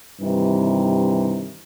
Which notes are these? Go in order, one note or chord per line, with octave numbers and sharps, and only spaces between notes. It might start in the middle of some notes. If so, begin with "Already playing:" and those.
G2 C3 D#3 E3